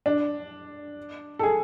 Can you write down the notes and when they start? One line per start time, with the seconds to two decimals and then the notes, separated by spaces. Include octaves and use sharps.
0.06 D4
1.39 A4
1.43 G#4